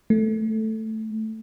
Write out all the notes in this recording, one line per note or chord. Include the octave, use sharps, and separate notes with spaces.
A3